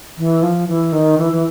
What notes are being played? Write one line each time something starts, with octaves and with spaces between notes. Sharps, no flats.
E3
F3
E3
D#3
E3
E3